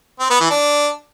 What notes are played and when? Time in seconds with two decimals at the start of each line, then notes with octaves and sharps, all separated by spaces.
0.20 C4
0.30 B3
0.40 E3
0.50 D4